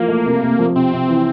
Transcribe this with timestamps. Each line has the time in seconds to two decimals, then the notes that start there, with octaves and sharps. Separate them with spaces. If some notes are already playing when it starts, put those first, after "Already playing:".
Already playing: E3 F3 A#3 F4
0.08 A3
0.25 C3
0.43 C3
0.59 F3
0.76 C3 C4
0.92 C3
1.08 E3